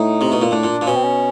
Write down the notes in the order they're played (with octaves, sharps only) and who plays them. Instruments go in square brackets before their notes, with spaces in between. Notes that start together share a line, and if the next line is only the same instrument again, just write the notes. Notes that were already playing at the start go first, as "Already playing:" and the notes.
Already playing: [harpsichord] A2 [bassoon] D#4
[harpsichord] C3
B2
A#2
[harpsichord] A2 [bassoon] D4
[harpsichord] A#2
A#2
[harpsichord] B2 [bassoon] C#4
[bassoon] C4
C#4